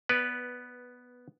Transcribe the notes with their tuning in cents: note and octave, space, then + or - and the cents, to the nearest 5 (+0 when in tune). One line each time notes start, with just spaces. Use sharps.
B3 +0 B4 -10 D5 +0